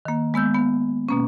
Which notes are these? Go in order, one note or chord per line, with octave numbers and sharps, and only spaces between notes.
D#3 A#3
G#3 B3 E6 G6
B3
B2 A#3 C#4